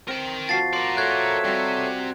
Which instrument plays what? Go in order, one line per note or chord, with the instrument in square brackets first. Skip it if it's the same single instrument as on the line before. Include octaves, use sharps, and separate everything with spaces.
[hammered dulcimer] C4 [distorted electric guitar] A#4 G5
[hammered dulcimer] F3 F#4 [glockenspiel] A6 C7
[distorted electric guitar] A#4 D5 [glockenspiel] C6
[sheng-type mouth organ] A4 C#5 E5 [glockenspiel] F#6 G#6
[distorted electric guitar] C3 [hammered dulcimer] G3 F#4